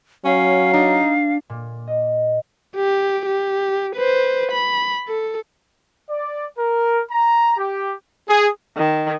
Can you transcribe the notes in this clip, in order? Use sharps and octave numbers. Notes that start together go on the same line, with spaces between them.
F#3 C#4 F5
D4 D#4
A#2
D#5
G4
G4
B4 C5
B5
A4
D5
A#4
A#5
G4
G#4
D#3